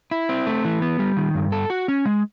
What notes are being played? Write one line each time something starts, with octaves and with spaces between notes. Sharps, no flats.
E4
C4
A3
E3
B3
G3
D#3
G2
A4
F#4
C#4
G#3